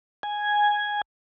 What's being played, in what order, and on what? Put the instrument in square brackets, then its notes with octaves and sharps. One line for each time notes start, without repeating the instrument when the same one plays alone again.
[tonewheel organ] G#5